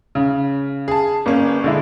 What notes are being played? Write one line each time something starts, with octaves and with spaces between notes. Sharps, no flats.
C#3
G#4 A5
G1 A#3 C#4
D3 G#3 E4